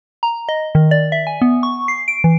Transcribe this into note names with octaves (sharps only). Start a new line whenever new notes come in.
A#5
D#5
D#3
D5
E5
G#5
B3
C#6
C7
D7
E3